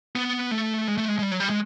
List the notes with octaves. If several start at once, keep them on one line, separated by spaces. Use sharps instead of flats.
B3
A3
G#3
A3
G#3
G#3
G3
F#3
G3
G#3